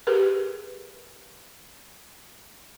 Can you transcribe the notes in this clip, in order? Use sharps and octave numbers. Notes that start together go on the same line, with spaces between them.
G4 G#4 A#4 B4